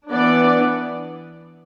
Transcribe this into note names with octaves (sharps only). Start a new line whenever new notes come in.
E3 B3 D4 D5